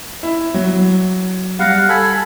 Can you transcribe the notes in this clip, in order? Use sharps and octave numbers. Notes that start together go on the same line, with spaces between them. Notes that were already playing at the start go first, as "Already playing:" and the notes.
E4
F#3
G3 F5 F#5 A#6
A4 G#5 B5